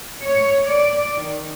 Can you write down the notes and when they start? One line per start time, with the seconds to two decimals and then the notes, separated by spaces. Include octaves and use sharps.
0.24 C#5
0.67 D5
1.15 D#3